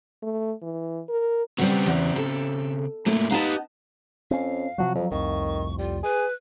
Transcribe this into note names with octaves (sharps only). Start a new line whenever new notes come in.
A3
E3
A#4
C#3 G3 B3 C4
E2
A4
G#2 A3 A#3
B3 D#4 G4 F5 A5
F2 C4 C#4 F5
C3 F3 F#3 F#4
F2 F3 F#3
C2 F2 A2 D#3 C#6
G3 F4
G#4 B4